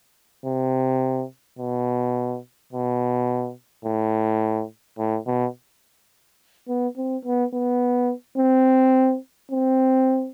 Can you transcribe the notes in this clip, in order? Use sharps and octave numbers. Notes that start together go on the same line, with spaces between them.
C3
B2
B2
A2
A2
B2
B3
C4
B3
B3
C4
C4